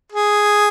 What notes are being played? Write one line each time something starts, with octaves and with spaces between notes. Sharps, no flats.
G#4